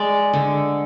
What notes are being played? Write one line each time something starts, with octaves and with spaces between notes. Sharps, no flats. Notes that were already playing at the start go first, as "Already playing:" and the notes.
Already playing: G#3 D5
D3